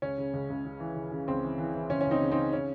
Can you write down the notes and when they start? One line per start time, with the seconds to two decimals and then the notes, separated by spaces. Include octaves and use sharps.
0.02 C#2 C#4
0.18 C#3
0.33 C#2
0.50 C#2
0.65 C#3
0.80 E3
0.96 C#3
1.12 C#3
1.28 C#2 C4
1.43 E3
1.58 E3
1.74 E3
1.90 C#2 C#4
2.01 C#2 C#4
2.11 C4 D#4
2.21 C#3
2.31 C4 D#4
2.37 C#3
2.53 C#4